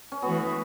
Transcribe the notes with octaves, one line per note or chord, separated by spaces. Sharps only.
C#4
E3 A3 B3 F#4